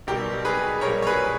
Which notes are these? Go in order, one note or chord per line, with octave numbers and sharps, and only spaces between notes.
B1 B2 G3 G4 A#4
G#4 B4
A#1 A#2 G3 A#4 C#5
C#5
G#4 B4